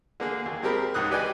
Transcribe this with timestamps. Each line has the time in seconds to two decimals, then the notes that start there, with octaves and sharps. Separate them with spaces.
0.20 D3 A#3 G#4
0.46 D#2
0.62 G#3 C4 G4 A#4 B5
0.94 C#2 G#2 D#6 F#6
1.11 G4 B4 D5 D#5 G5 G#5